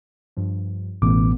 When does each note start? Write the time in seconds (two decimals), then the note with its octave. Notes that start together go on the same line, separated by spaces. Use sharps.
0.37 G2 F3
1.02 A1 B2 A3 B3 D6